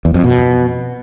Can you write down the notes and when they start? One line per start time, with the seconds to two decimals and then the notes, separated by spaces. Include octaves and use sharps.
0.05 E2
0.14 F2
0.24 B2